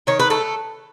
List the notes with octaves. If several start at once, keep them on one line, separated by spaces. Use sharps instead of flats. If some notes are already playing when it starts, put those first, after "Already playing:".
D#3 C#5
B4
A3 A4